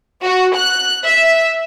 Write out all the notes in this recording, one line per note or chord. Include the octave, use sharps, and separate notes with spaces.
F#4
F#6
E5